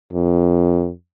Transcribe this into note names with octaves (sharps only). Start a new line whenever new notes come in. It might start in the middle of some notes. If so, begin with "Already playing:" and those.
F2